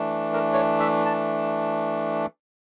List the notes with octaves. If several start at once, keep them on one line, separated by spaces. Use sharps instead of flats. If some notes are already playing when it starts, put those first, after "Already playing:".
Already playing: E3 A3 D4
A#4
C#5
E5
A5